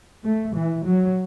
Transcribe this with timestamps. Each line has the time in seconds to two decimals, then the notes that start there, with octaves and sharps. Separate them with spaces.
0.25 A3
0.56 E3
0.86 F#3